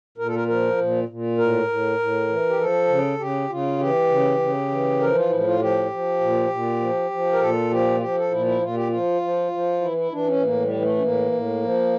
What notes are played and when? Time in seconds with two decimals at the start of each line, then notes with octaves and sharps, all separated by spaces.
0.18 A#2 A#4
0.26 A4
0.35 A#4
0.48 F3 A#4
0.78 A#2
1.08 A#2
1.38 A2 A#4
1.68 A2
1.99 A2
2.29 E3
2.49 G4
2.59 F3 A4
2.89 C#3
3.19 C#3 G4
3.49 C#3 F4
3.79 E3 G4
4.09 C#3
4.39 C#3
4.69 E3
5.00 F3 A#4
5.15 F4
5.30 A2 E4
5.40 E4
5.45 F4
5.59 F3 G4
5.90 F3
6.20 A#2
6.50 A#2
6.80 F3
7.11 F3
7.33 A#4
7.40 A#2 A4
7.70 F3 G4
7.97 F4
8.00 F3 G4
8.17 A4
8.31 A#2 E4
8.46 E4
8.62 A#2 F4
8.74 G4
8.88 F3 F4
9.22 F3
9.52 F3
9.81 E3 E4
9.97 E4
10.12 E3 D4
10.27 C#4
10.42 A2 A#3
10.62 G3
10.72 E3
10.82 A3
10.98 C#4
11.02 A2 A#3
11.32 A2
11.62 F3